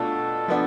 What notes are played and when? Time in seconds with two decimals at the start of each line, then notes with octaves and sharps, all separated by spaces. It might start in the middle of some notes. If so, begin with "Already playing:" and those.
Already playing: B2 A3 D4 F4 A4
0.48 F3 B3 D4